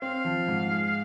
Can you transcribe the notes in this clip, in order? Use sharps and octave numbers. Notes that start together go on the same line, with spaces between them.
C4 F5
F3
G#2
G#3